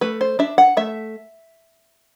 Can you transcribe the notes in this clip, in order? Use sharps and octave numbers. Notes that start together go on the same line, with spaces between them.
A3 B4
C5
D4 E5
F#5
A3 E5